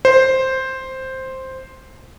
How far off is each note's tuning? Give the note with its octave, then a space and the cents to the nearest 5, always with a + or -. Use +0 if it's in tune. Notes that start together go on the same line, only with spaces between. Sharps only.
C5 +5